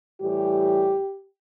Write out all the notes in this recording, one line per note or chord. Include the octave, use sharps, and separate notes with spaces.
A2 E3 G3 G4